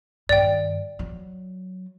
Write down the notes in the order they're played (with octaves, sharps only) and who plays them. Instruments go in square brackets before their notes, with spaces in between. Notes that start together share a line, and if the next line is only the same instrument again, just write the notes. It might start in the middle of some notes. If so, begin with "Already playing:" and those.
[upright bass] G2 D#3 [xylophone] D5 G5
[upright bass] F#3